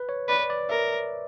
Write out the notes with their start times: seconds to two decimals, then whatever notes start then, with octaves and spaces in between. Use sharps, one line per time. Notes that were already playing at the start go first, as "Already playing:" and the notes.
Already playing: B4
0.09 C#5
0.29 B4 D5
0.50 D5
0.69 A#4 E5